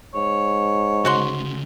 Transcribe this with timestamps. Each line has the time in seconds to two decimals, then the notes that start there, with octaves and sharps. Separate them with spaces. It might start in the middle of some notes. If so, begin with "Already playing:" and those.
0.15 G#2 C#5
1.05 D2 C#3 F#4 F#5 C6